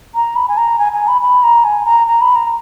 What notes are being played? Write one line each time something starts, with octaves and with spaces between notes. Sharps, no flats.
A#5
B5
G#5
A#5
G#5
G#5
B5
B5
A#5
G#5
A#5
A#5
B5
A#5